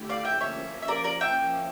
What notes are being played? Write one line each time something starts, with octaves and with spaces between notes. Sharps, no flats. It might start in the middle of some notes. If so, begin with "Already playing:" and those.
Already playing: D3 A3 E4 G4
D5 F5
F3 A#3 C#4 E5 G5
C#5 E5
E5
A#4 D5
A#4 D5
E5 G5